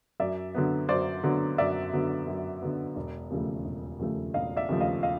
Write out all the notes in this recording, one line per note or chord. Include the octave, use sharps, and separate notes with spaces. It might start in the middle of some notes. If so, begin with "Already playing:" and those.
F#2 D5 E5
D3 F#3 B3
F#2 C5 D5
D3 F#3 B3
F#2 D5 E5
D3 F#3 B3
F#2
D3 F#3 B3
E1
D#2 C#3 F3 A3
E1
D#2 C#3 F3 A3
E1 D#5 F5
D5 E5
D#2 C#3 F3 A3
D#5 F5
D#5 F5